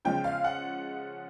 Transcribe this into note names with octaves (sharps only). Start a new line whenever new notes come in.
C#3 F3 G#3 G5
F5
F#5